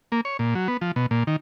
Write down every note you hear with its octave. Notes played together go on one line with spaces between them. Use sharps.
A#3
C#5
A#2
F#3
B3
F3
B2
A#2
D#3